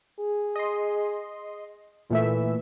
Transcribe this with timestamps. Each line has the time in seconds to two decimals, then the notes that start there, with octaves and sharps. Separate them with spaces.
0.19 G#4
0.56 D#5 C6
2.10 A#2 E3 A3 E5